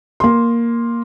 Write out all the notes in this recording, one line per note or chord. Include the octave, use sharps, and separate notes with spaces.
A#3 C6